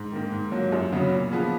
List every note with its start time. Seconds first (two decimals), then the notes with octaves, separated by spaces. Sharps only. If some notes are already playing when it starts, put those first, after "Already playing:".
Already playing: G#2
0.12 D#3 A#3
0.32 G#2
0.51 F#3 A#3 F4
0.72 F#2
0.92 C#3 F#3 B3
1.11 A#2
1.31 F3 B3 F4 G#4